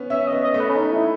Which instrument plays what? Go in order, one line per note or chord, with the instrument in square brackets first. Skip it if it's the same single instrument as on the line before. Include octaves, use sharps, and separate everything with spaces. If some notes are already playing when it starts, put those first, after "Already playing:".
Already playing: [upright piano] B3 C#4
[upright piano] C#4 [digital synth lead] E5
[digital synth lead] D#5
[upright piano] B3
[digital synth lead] D#5
[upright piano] A3
[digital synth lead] B4
C#4
D#4
E4